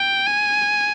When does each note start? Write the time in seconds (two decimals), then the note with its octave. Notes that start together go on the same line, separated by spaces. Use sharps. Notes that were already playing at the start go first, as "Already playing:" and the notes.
Already playing: G5
0.27 G#5